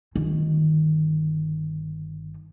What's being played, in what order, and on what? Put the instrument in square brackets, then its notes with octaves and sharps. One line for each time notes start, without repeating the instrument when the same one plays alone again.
[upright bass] G1 D#3